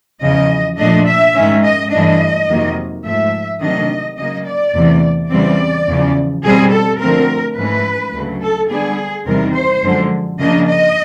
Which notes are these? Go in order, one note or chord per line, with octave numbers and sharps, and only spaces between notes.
E2 C#3 F3 D#5
A#2 F3 A3 D4 D#5
E5
G#2 D#3 G#3 C#4
D#5
G2 E3 A3 D4 D#5
F2 C3 D#3 F#3 A#3
G#2 F3 A3 E5
C3 D#3 F#3 A3 D4 D#5
C#3 F#3 A#3 D#5
D5
E2 C3 E3 A3
E2 C#3 E3 G3 C4 D5
E2 C#3 F3
B2 G3 C4 G#4
A4
D3 F3 A3 C4 A#4
G#2 E3 A3 C#4 B4
D2 C#3 F#3 A3
A4
D3 G3 B3 D4 G#4
E2 C3 D#3 G3 C4 A#4
C5
F#2 D3 F3 G#3
C#3 F3 A#3 D4 D#5
D#5